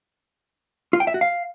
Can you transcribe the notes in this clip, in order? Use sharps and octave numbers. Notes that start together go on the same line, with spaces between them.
F4
G5
E5
F#4
F5